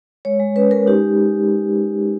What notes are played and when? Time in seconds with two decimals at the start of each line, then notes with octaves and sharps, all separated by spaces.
0.25 G#3 C#5
0.40 G#3
0.56 C#4 B4
0.71 G#3 A#4
0.87 D#4 G4